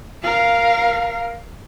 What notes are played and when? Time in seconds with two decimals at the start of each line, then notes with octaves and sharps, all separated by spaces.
0.23 A#4 F5